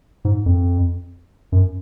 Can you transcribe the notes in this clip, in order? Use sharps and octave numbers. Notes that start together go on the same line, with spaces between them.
G#2
F2
F#2